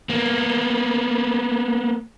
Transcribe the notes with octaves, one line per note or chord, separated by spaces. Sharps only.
A#3 B3